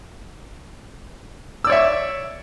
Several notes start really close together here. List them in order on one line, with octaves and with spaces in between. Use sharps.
E6 D5 C#5 E5